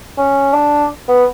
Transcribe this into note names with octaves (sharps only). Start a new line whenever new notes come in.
C#4
D4
B3